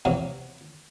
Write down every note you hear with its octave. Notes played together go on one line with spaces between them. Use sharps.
E2 C3 F#3